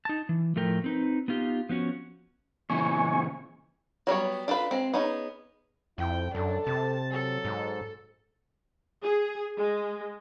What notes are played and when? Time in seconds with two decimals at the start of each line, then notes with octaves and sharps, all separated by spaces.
0.05 D#4 A5
0.29 E3
0.56 A2 F3 A3 A#4 G5
0.84 C4 D#4 B4
1.28 B3 D#4 F4 G4
1.69 F3 B3 C#4 F#4
2.70 A#2 C#3 E3 G#5 C#6
4.07 F#3 G3 B3 C#5
4.48 D4 F4 A4 B4
4.71 G#3 C4
4.94 B3 C#4 D#4 G#4
5.98 F2 E4 G5
6.35 F#2 D4 A4
6.67 C3 A5
7.11 F#3 A4
7.45 G#2
9.02 G#4
9.57 G#3